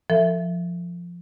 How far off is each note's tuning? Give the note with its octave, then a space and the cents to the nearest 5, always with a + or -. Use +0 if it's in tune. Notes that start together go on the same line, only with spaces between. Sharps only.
F3 +0 A4 +35 E5 +0